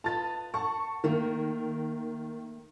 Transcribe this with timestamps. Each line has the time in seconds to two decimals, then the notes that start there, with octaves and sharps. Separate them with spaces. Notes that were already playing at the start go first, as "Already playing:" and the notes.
0.04 F4 B4 D#5 A5 A6
0.54 F#5 A5 C#6
1.04 D#3 A3 A#3 A#4